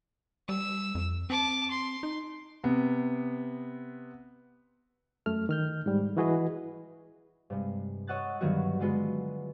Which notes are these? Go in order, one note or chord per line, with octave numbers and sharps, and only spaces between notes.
G3 E6
F2
C4 A5 D6
C6
D#4
C3 B3
F#2 A3 F6
D#3 F6 G6
G#2 G3
E3 E4 F#4 G#4 B4 D#5
G2 C3 G#3
C#5 D#5 F#5 E6 F#6 A6
G2 D3 D#3 F#3 B3 F#4
D3 F#3 G#3 B3 F4